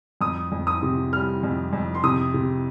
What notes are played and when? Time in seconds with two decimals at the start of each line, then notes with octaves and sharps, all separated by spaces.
0.21 F2 D#6
0.52 F2
0.67 D#6
0.83 C3
1.13 G3 F6
1.43 F2
1.73 F2
1.94 C6
2.03 C3 D#6
2.34 C3